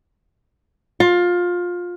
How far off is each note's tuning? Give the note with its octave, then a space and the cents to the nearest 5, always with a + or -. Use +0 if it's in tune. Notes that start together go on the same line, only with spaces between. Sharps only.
F4 +20